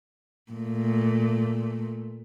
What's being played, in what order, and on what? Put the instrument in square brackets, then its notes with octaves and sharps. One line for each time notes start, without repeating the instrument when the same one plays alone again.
[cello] A#2 A3